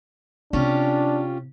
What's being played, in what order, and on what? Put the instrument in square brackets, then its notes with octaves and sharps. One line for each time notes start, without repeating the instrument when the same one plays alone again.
[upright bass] C3 [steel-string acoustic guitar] C#4 F4 G4 [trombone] D4